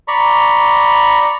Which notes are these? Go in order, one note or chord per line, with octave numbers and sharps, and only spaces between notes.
D5 A#5 B5 C#6